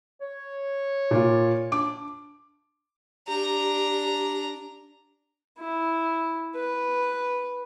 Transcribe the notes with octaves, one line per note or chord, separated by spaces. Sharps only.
C#5
A#2 F4
D4 D6
D4 G4 A#5
E4
B4